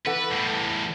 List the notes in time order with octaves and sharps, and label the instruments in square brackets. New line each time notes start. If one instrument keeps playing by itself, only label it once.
[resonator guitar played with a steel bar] E3 A4 F#5 [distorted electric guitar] B4
[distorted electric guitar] E2 A2